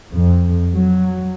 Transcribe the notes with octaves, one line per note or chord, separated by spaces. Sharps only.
F2
F#3